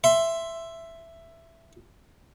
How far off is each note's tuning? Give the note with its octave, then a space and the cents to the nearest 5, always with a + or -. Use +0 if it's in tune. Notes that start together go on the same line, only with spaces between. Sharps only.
E5 +10 C6 +0